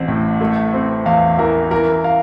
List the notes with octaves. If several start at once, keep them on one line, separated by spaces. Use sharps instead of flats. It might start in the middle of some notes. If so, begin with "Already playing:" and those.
Already playing: A1 C4
A2
A3
C4
E2 F5
E3 A#4
E3 A#4
F5